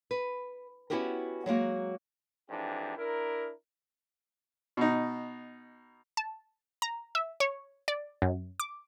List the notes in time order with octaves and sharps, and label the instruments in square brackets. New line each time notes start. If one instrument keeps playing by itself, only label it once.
[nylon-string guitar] B4
B3 C#4 E4 F#4 G4 A#4
F#3 G#3 A#3 F#4
[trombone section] F2 G#2 E3 D4 G4
D4 E4 A#4
[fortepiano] B2 D#4
[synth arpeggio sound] A5
A#5
E5
C#5
D5
F#2
D6